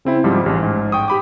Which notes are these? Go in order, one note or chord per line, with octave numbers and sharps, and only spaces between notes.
C#3 C4 E4
G#2 F3 G3
A1 G#2
G#2
G5 C#6 D#6
G4 B5 D6